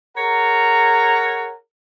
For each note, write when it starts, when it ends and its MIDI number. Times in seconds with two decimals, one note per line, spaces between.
0.17 1.53 68
0.17 1.53 70
0.17 1.53 73
0.17 1.53 78
0.17 1.53 82